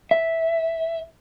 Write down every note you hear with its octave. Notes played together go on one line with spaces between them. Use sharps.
E5